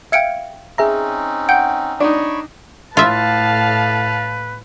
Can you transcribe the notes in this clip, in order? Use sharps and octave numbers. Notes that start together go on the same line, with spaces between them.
E5 F5 G5 G#6 C#7 D7
C4 C#4 D#4 G#4 E5 A#5
F#5 G5 G6
D4 D#4 C#5 B5 C#6
A2 F4 B4 E5 F5 A5